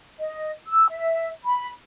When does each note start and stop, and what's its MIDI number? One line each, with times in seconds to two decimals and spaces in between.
0.19 0.50 75
0.68 0.86 88
0.89 1.29 76
1.45 1.70 83